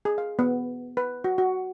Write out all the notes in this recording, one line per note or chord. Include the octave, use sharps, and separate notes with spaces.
G#4
F5
B3
B4
F#4
F#4